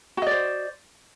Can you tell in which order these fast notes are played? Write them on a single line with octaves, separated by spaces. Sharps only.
F#4 D#5 D5 C5